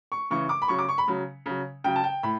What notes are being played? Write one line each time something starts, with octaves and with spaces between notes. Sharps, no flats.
C#6
C#3 E3 C#6
D6
B5
C#3 F#3 C#6
D6
C#6
B5
C#3 F#3
C#3 F#3
C#3 F#3 G5
A5
G5
A2 B5